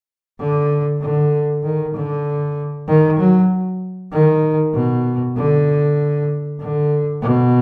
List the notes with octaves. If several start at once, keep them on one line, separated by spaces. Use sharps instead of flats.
D3
D3
D#3
D3
D#3
F#3
D#3
B2
D3
D3
B2